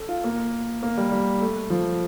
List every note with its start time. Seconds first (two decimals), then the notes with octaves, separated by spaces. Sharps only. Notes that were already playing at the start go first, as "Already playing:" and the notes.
Already playing: A4
0.09 F4
0.24 A#3
0.83 A#3
0.97 G3
1.11 G3
1.41 A3
1.70 F3